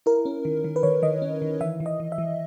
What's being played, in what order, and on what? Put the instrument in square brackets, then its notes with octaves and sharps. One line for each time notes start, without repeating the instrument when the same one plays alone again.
[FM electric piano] E4 A#4
C#4
D#3
D#3
B4
D#3 C#5
D#3 D#5
C#4
D#3
E3 E5
E3
D#5
E3
E5
E3